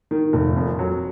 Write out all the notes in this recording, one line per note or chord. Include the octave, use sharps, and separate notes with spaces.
D#3
F1
F2
F#3